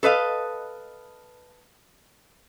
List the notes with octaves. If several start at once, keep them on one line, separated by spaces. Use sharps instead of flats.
A4 B4 D#5 F5